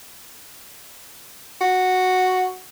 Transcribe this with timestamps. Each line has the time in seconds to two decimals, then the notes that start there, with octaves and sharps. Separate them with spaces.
1.61 F#4